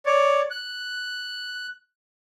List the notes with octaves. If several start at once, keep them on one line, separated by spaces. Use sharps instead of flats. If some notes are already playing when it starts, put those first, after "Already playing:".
C#5 D5
F#6